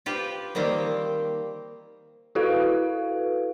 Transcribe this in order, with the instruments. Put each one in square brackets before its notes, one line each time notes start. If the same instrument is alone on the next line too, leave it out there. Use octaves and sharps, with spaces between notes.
[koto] F4 G4 B4 C5
D#3 G3 A#3 C4 G4
[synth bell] E4 F#4 A4 B4 F5